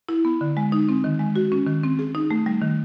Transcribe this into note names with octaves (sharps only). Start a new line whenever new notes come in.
E4
B3
D3
G#3
D#4
C4
D#3
G#3
F#4
C#4
D#3
C4
G#4
D#4
A3
G3
D#3